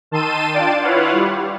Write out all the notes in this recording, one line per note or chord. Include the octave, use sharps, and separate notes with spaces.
D#3 A5 C6 E6 D#7
D4 F4 D5 G5 A5
E4 F4 B4 C#5 F5 F#5
G3